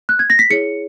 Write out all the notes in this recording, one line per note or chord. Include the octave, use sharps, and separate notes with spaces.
F#6
G#6
A#6
B6
E4 G#4 C#5 C#7